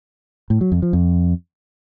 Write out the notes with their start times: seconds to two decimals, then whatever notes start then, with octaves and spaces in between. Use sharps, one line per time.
0.50 A2
0.61 F#3
0.72 F2
0.82 F3
0.93 F2